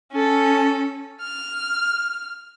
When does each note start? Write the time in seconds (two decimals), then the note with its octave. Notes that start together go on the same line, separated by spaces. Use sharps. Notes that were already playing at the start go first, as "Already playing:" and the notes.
0.12 C#4 A4
1.22 F6